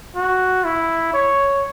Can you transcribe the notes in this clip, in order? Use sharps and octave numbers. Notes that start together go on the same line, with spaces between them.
F#4
E4
C#5